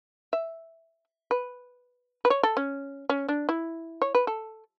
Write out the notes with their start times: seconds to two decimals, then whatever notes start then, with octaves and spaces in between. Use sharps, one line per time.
0.33 E5
1.31 B4
2.25 B4
2.30 C#5
2.43 A4
2.57 C#4
3.09 C#4
3.28 D4
3.49 E4
4.02 C#5
4.15 B4
4.27 A4